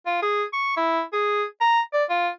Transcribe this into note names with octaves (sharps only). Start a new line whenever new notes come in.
F4
G#4
C#6
E4
G#4
A#5
D5
F4